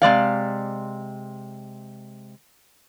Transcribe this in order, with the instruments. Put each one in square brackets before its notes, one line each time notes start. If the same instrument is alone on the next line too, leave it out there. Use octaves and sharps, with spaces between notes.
[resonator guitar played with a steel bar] C3 G#3 D5 F5